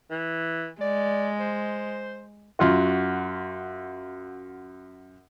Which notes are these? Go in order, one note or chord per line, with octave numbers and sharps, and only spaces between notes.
E3
G#3 D5
C5
F#2 F4 F#4